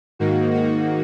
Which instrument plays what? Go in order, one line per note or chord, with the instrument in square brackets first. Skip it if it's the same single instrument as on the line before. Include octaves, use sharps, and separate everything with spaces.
[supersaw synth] G#2 D#3 A#3 D#4 F#4
F#4